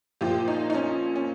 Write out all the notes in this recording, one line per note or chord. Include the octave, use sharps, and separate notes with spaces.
A#2 F3 G4
D#4
D#4
C#4
C#4